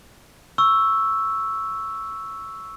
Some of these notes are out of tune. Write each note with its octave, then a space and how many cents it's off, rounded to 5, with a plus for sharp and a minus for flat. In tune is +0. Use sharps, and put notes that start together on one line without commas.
C#6 +0 E6 +0